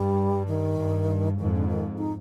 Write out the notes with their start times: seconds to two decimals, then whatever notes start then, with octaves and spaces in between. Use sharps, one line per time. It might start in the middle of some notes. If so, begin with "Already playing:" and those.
Already playing: G2 G3
0.47 D#3
0.78 G2
1.38 F2 G#2 D#3
1.54 D3
1.69 D#3
1.98 D#4